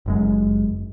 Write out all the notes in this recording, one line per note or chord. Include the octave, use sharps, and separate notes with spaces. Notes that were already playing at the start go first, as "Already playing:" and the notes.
F#1 F#2 G#3